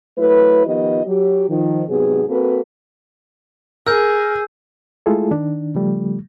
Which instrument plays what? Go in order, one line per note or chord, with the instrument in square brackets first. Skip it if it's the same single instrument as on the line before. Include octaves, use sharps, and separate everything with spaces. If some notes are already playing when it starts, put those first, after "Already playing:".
[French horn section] F#3 A3 E4 B4
D#3 F3 B3 F4 G4 D#5
F#3 G4
D#3 F3
G#2 C3 F#3 B3 G#4
A#3 C4 F#4 A4 B4
[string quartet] G#4 [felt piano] A#4 [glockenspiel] E6 G6
[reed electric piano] G#3 A3 E4 F4 G#4 A4
D#3 D4
C#3 F3 G3 A3